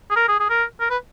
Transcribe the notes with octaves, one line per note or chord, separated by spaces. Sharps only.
G#4
A#4
G#4
G#4
A#4
A#4
B4